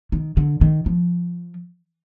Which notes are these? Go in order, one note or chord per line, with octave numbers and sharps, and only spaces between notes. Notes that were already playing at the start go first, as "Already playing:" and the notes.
D#3
D3
D#3
F3